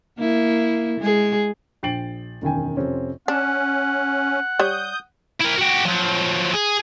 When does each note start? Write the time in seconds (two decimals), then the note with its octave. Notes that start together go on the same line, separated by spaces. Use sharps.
0.19 A#3 E4
1.00 G#3 G#4
1.83 A#1 G5 A6 C7 D7 F#7
2.42 E1 F#2 D#3 G5 G#5
2.77 F2 C3 C4 C#4
3.28 C#4 D4 F#5
4.59 G3 C#5 D#6 G6
5.40 E4 A#4
5.57 F#4 G4
5.85 F3 F#3
6.54 G#4